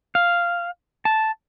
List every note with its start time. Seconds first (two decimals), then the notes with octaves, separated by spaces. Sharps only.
0.15 F5
1.05 A5